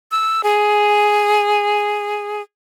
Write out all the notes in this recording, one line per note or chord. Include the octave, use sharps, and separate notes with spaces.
E6
G#4